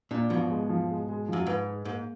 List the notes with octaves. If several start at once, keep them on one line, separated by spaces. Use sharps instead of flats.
A#2 D4
G#2 B2 F3
G#3
F3
G#3
G#3
F#2 F3
G#2 B4
G#4
G#2 A#3